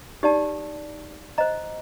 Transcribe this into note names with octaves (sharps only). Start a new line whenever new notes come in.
D#4 G4 D5 A5
C5 D#5 A#5